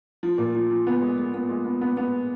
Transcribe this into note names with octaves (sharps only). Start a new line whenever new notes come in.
F3
A#2
F3
F3
B3
G#3
G#3
B3
G#3
B3
B3
B3